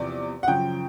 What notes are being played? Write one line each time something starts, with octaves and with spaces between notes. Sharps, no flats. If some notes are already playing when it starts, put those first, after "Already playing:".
Already playing: E2 C3 F3 D5
F#5
F#2 C#3 F3 G5